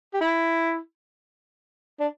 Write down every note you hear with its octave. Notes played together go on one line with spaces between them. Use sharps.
G4
E4
D4